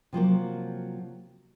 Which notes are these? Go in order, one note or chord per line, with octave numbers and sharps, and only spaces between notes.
C3 F3 F#3 A#3